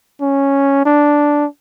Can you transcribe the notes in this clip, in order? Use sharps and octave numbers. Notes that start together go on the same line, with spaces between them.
C#4
D4